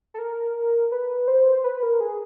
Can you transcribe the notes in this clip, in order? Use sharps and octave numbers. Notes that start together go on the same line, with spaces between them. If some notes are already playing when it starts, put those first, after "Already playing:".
A4
A#4
B4
C5
B4
A#4
G#4